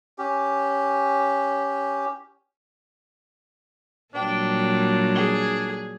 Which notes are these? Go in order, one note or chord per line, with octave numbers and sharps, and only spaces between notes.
C#4 G4
A#2 F#3 G3 D4 G5
G#4